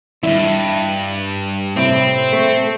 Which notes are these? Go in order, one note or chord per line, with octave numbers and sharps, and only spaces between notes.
E2 G2 E4
A2 C3 C4 E4
A3